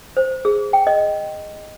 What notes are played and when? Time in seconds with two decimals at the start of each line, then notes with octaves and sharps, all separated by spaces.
0.17 C5
0.45 G#4
0.73 G5
0.87 D#5